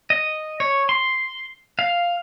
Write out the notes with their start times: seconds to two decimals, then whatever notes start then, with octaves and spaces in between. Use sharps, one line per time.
0.10 D#5
0.60 C#5
0.89 C6
1.79 F5